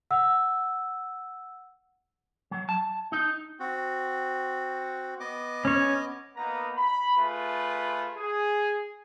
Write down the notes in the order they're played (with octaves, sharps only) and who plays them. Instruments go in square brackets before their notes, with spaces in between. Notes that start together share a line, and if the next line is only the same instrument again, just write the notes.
[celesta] F#5 E6
[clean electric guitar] F#3
A5
D#4
[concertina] C4 F#4
B3 D#5 D6
[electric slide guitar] C#4 C#5
[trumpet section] A#3 B3 D#4 A#5
B5
A3 F4 G#4 B4
G#4